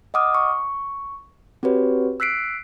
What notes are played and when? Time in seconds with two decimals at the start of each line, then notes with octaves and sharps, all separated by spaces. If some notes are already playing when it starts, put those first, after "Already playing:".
0.14 D#5 F#5 D6 D#6 F6
0.35 C#6
1.63 C4 F#4 G4 B4 C#5
2.20 E6 F#6 B6 C7 D7